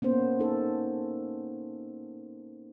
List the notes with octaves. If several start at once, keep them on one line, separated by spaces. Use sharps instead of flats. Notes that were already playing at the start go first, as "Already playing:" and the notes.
A#3 B3 C#4 C5
D#4 A4